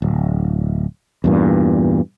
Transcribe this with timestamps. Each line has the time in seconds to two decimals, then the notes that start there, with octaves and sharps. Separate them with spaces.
0.02 D1
1.24 E2 G2 A#2